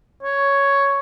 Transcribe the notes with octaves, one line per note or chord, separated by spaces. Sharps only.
C#5